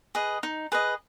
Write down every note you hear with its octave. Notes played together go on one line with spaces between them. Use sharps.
G#4 B4 D#5
D#4
G#4 B4 D#5